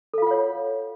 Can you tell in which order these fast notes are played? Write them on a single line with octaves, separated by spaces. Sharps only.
A4 F5 F4 F#5 C#5